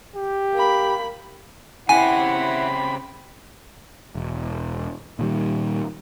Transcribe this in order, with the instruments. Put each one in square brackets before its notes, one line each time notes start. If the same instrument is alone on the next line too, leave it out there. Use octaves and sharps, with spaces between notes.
[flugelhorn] G4
[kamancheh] A#3 B5
[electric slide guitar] C#3 C4 G4 [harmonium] E4 F#5 [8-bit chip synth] G#5 [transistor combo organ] B5
[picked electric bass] E1
A#2 D#3 G3